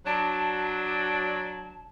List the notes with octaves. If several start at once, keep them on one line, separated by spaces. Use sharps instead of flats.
F#3 D4 A5